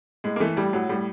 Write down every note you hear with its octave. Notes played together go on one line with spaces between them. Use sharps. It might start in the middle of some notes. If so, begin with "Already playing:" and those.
A2 G#3
A#3
E3 A3
A2 G3
A2 F#3
A2 G3